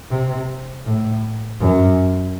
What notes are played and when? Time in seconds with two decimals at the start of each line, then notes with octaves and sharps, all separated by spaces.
0.11 C3
0.85 A2
1.60 F#2